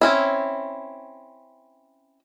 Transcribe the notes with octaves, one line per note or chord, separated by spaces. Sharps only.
C4 C#4 E4